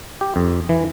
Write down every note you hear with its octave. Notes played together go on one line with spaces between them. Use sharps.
G4
F2
E3